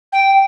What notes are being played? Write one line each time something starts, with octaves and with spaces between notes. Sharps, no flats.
G5